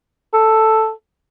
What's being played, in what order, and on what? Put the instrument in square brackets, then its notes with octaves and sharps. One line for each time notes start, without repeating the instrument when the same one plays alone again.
[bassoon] A4